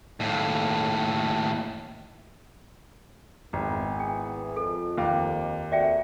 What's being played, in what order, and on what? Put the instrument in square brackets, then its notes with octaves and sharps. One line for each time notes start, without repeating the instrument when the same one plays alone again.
[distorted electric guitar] D#2 A2
[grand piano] G#1 [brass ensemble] B3 E4 G#4
[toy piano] G5
[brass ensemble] F2 [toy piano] A4
[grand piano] D#2 F5 D6
[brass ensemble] A3 C4 F#4 [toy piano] D5 E5 G5